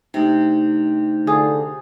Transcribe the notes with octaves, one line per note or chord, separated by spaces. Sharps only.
C3 A3 D4 D#4
D3 F4 G#4